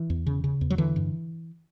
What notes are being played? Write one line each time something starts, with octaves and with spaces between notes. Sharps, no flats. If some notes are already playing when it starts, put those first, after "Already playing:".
Already playing: E3
E2
C#3
C#3
E2
F#3
D3 E3
G2